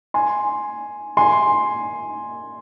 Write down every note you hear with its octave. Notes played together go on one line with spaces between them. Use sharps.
G#5 C6
G#5 C6